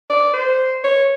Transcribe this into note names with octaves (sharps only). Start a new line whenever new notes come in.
D5
C5
C#5